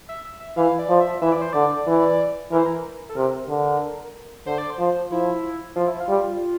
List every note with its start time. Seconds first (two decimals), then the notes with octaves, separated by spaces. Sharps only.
0.09 E5
0.25 E5
0.40 E5
0.57 E3 F5
0.79 D5
0.89 F3
1.00 E5
1.22 E3 E5
1.32 D5
1.42 C5
1.53 D3 D5
1.87 E3
2.52 E3 A#4
2.58 C5
2.66 A#4
3.09 A4
3.16 C3 A#4
3.49 D3
4.46 D3 C5
4.58 D5
4.70 C5
4.79 F3
5.11 F3 E4
5.76 F3 F4
5.87 E4
6.00 F4
6.08 G3